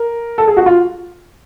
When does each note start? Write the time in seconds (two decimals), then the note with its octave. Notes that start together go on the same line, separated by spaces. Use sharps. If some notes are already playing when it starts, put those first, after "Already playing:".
Already playing: A#4
0.38 A4
0.47 G#4
0.57 F#4
0.66 F4